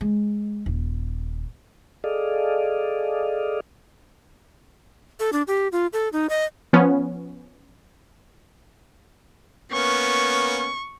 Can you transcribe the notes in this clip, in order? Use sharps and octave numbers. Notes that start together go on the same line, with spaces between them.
G#3
D#1
G#4 A4 D5 D#5 F5
A4
D4
G4
F4
A4
D#4
D#5
F3 B3 C#4
A#3 B3 C#4 C#6